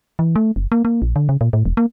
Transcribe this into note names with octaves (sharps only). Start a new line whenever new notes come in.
E3
A3
F#1
A#3
A#3
A#1
D3
C#3
A#2
A2
E1
A#3